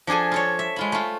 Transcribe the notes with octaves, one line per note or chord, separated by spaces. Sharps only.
F3 D4 G#4 A4 G#5
F4 A4 C#5
E5
G#3 F4 B5
A3 F4